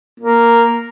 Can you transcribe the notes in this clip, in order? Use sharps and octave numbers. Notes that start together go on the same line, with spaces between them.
A#3